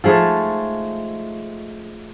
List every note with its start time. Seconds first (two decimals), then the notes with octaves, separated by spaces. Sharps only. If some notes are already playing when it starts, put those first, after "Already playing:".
0.04 F3 G#3 A3 D#4